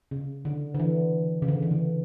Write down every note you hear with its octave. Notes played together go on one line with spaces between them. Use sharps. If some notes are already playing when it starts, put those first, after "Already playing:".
C#3
D3
D3
E3
C#3
D3
E3
D3